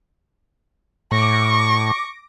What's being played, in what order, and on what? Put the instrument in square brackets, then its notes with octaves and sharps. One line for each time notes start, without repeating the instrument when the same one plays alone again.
[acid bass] A2 [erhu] C#6 [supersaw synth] D6 A#6